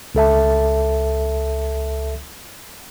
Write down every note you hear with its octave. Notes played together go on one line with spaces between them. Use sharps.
C#2 A4 E5 A5